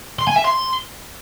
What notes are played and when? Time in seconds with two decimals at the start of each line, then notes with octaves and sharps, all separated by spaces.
0.19 C6
0.28 G#5
0.36 E5
0.45 C6